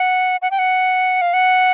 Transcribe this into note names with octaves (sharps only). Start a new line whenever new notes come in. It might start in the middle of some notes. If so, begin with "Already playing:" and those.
Already playing: F#5
F#5
G5
F#5
F5
F#5